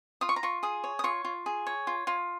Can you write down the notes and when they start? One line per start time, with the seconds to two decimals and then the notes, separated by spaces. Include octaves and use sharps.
0.21 F4 D#6
0.29 C#6
0.36 A#5
0.43 F4 C#6
0.63 G#4 D#6
0.84 C#5
0.99 D#6
1.04 F4 C#6
1.25 F4
1.46 G#4
1.67 C#5
1.87 F4
2.07 F4